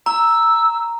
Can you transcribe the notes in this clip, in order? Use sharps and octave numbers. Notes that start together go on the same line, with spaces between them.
A#5 E6